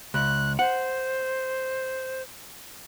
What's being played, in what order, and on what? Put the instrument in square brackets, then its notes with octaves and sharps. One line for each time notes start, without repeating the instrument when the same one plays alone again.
[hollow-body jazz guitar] C#2 [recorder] F#6
[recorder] C5 [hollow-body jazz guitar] F#5